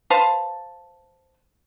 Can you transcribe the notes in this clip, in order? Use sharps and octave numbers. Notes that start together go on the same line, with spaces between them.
B4 C5 F5 A5